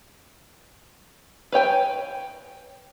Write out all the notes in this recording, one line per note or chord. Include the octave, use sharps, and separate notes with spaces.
B4 C#5 G5 G#5